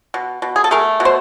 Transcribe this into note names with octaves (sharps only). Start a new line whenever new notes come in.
B2
B2
G#4
A4
A3 G#4 A#4
B2
C5